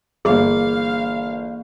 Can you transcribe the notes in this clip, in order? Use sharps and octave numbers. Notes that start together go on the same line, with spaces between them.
G1 E3 A#3 G#4 F5